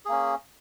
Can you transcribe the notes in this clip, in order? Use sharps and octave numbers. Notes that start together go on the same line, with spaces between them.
A#3 C#4 G#4